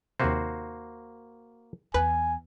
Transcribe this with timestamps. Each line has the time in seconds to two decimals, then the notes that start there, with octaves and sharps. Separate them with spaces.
0.20 D#2 C3 A#3 F#4 C5
1.94 E2 B4 G#5